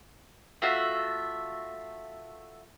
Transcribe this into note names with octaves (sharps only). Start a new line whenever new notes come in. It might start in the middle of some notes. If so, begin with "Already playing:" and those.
A3 F4 F#4 E5